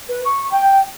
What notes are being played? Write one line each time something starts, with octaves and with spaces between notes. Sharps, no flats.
B4
C#6
G5